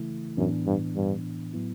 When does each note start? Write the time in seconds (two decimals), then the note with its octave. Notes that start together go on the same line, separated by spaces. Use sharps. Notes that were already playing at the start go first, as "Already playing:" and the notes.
Already playing: C#3 E3 A3 E4
0.37 F#2 A2 E3 B3 D4
0.66 G2
0.95 G2
1.53 A2 F#3 B3 E4